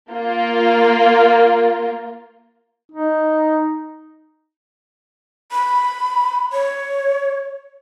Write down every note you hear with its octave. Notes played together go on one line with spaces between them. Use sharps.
A#3 F4
D#4
B5
C#5